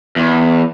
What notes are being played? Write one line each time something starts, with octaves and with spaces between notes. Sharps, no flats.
E2